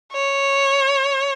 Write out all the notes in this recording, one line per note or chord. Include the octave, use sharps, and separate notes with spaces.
C#5